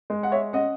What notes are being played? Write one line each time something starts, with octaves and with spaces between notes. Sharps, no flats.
G#3
F#5
C#5 E5
C#4 D#5 F#5